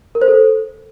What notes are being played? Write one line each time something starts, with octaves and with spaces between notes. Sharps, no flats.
A#4
C5
A4